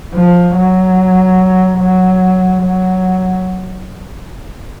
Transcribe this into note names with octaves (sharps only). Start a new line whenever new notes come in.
F3
F#3
F#3
F#3